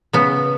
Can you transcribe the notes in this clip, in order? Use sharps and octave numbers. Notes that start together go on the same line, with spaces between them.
C#3 B3